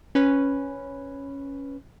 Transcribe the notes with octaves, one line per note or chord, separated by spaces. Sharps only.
C#4 B4